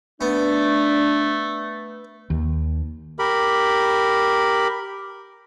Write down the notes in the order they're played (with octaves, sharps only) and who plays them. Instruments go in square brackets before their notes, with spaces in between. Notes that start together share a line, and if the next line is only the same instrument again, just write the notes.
[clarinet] A3 [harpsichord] B3 [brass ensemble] D4
[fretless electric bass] D#2
[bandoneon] G4 A#4 B5